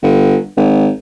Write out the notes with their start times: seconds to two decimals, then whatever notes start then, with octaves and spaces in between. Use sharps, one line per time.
0.03 G1
0.56 G#1